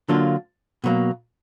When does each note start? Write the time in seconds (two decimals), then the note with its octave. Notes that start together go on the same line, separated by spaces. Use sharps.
0.09 D3 F#3 A#3 D4 F4
0.84 B2 F#3 A#3